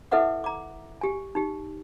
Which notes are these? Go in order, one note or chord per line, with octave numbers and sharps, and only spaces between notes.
E4 A4 B4 E5 F#5 D6
A#5 D6
G4 G#5
D#4 G4